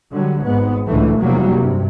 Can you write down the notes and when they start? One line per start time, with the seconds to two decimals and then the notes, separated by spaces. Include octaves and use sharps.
0.12 D3 F#3 G3
0.44 G#1 G#2 B3
0.87 C#2 A2 D3 E3 A3
1.18 F1 E2 C3 F#3 G3 A#3
1.53 G2 C3